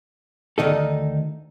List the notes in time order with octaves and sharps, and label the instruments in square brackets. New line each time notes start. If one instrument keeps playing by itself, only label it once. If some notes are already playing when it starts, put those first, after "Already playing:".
[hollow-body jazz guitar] D2 D#3 D#4 A4